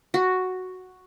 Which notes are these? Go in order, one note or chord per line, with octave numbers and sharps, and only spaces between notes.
F#4